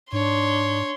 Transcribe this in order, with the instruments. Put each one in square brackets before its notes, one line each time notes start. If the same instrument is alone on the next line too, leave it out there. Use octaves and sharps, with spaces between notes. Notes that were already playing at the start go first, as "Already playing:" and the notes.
[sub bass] G#2 [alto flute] D4 [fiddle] C#5 [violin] C6